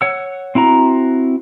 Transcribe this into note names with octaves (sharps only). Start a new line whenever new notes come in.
C#5 F#5 E6
C4 E4 F#4 A#5